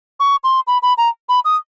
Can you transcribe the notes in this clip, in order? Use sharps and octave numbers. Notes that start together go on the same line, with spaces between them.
C#6
C6
B5
B5
A#5
B5
D#6